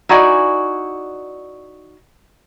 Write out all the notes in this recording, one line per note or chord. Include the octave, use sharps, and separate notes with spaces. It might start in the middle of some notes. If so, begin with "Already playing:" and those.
D#4 E4 F#4 D5 G#5